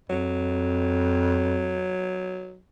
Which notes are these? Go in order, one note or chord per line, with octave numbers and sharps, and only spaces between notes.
F2 F#3